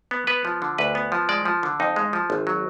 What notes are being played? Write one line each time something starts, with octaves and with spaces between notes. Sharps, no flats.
B3
B3 B4
F3
D3
D2 B4
B3
F3
G#3 D5
F3
D3
F2 D#4
G#3
F3
G#1
F#3